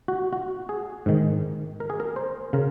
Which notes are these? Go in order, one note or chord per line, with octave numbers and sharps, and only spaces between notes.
F#4
F#4
G#4
G#2 D#3
A#4
G#4
A#4
C5
C#3 A#4